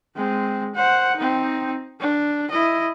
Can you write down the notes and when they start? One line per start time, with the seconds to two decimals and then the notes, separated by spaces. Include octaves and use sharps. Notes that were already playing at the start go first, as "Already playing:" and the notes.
0.16 G#3 C4
0.75 C5 F#5
1.17 C4 D#4
2.00 D4
2.51 E4 D#5